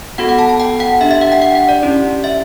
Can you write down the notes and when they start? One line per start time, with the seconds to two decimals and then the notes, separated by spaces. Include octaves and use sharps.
0.18 B3 F#4 A4 F#5
0.29 F#5
0.39 A5
0.49 A5
0.60 G5
0.80 F#5
1.00 D4 G4 E5
1.11 E5
1.21 F#5
1.32 G5
1.42 F#5
1.55 F#5
1.69 D5
1.83 C#4 E4 G4
2.24 E5